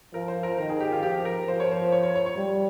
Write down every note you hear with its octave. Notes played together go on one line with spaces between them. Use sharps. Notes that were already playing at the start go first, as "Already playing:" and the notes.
F3 A#4
C5
A#4
D#3 A#4
G#4
G4
F4
F3 G4
A#4
F3 C5
C#5
C5
C#5
C#5
C#5
C#5
G3